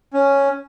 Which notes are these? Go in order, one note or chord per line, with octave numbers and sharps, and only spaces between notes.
C#4